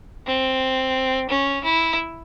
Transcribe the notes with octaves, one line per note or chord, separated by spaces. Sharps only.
C4
C#4
E4